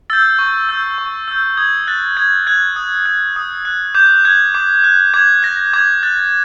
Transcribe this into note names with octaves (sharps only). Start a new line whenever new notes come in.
E6 G6 A6
C#6
E6 G6
C#6
E6 G6
D#6 G#6
F#6 A6
D#6 G#6
F#6 G#6
D#6
F#6
D#6
F#6
D6 G6
F#6 G#6
D6
F#6
D6 G#6
F#6 A#6
D6 G#6
F#6 A6